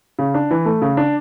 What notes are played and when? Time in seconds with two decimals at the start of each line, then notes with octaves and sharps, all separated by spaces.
0.19 C#3
0.34 D4
0.51 E3
0.66 A3
0.82 C#3
0.97 D4